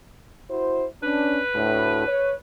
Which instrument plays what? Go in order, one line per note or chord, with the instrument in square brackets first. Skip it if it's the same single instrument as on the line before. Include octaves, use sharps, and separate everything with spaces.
[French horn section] E4 F#4 C5
[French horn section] C#4 D4 [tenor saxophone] B4
[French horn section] D2 A2
C#5